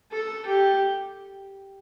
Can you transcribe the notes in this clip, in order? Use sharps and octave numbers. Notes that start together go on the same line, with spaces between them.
A4
G4